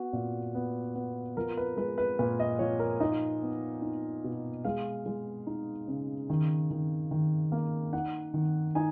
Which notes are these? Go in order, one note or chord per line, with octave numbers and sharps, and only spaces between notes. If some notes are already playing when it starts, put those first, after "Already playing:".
Already playing: B3 F#4
A#2
B3
B3
F3 A#4
B4
G#3 B4
B4
A#2 B4
D#5
F3 C#5
A#4
D#4 D#5
B3
D#4
B2
G#3 F5
G#3
D#4
C#3
D#3
D#3
D#3
A#3
D#4 F#5
D#3
D#4 G#5